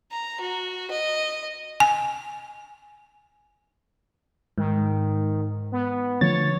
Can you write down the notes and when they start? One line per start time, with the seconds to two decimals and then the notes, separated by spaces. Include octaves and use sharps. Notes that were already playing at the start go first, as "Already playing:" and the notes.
0.11 A#5
0.40 F#4
0.90 D#5
1.80 G#5
4.58 G#2 D#3
5.72 B3
6.21 D3 F3 A3 C#5 A6